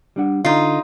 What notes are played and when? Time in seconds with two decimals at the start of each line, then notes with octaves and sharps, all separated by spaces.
0.16 G3 D4 F#5
0.45 D3 D#4 F4